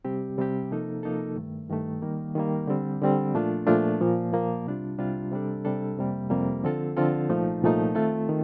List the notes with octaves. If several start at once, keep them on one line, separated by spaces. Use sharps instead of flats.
C3 G3 C4 G4
C3 G3 C4 G4
C3 F3 A#3 D#4 A4
C3 F3 A#3 D#4 A4
G2 D#3 A3
G2 D#3 A3
D#3 G3 A#3
D#3 G3 A#3
D3 G3 C4
D3 G3 C4
A#2 F3 A3 D4 F4
A#2 F3 A3 D4 F4
A#2 F3 A#3
A#2 F3 A#3
C2 C3 G3 D4 F4
C2 C3 G3 D4 F4
C3 G3 D4 A4
C3 G3 D4 A4
F2 C3 G3 A#3
F2 C3 G3 A#3
D3 F3 C4 F4 A4
D3 F3 C4 F4 A4
C2 A#2 F3 A3 D#4
C2 A#2 F3 A3 D#4
D#3 A3 C4 F4 A4
D#3